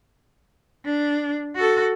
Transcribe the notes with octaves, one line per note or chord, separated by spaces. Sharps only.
D4
F#4 A4